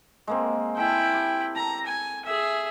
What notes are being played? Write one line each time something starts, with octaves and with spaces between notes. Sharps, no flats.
G#3 A#3 C4
E4 A4 G5 G#5
G4
A4 A#5
G#5
G#4 E5